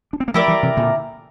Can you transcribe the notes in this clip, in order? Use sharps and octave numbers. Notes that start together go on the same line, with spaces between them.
D4
C4
A#3
F3 A3 E4 G4 A#4 D5
E3 G3
C3 E3
A#2 D3